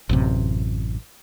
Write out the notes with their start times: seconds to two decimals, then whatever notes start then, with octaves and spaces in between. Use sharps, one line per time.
0.09 A1 F#2 C3